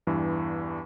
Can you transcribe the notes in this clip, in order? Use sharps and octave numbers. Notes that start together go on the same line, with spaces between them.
E2 G2 E3